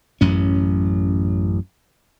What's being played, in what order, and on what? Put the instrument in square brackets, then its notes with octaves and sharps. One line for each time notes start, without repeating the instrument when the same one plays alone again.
[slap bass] A1 F#2 C#4